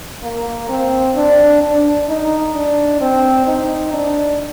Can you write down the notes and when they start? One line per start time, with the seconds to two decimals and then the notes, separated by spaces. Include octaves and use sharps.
0.23 A#3
0.69 C4
1.16 D4
1.62 D4
2.08 D#4
2.55 D4
3.01 C4
3.47 D#4
3.94 D4